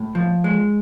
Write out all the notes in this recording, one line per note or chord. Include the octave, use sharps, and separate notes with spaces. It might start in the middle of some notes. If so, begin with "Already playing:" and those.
Already playing: A2
F3
G#3